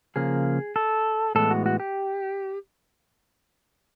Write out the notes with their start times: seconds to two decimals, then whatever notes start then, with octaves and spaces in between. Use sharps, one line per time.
0.16 C#3 F3 A#3 G#4
0.76 A4
1.35 A2 E3 G#3 B3 A4
1.51 F#4
1.66 F#4
1.80 G4